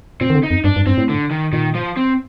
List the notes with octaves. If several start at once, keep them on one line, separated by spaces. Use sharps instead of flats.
A#2 C4
D#3
D3
D#4
F2
G2 D4
G2
G2 C4
A2
D3
D#3
A#2 D#3
F3
C4